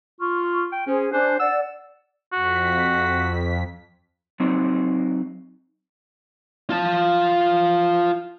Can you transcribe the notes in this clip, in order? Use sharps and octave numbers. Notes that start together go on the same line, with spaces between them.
F4 C#6 F6
G5
C#4 G#4 C5
D4 C5 G#5 F#6
D5 F#5 E6
F2 F#4 B6
F#3 C4 D#4
F4 A5